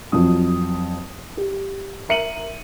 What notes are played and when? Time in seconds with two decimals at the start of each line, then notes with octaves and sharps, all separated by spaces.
0.12 F2 F3 F#3 D#6
1.37 G4
2.09 A#4 E5 C#7 D#7 F#7